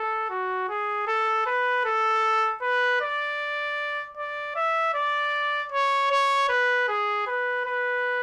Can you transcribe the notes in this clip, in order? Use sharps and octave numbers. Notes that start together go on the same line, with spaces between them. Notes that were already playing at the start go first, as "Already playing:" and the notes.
Already playing: A4
F#4
G#4
A4
B4
A4
B4
D5
D5
E5
D5
C#5
C#5
B4
G#4
B4
B4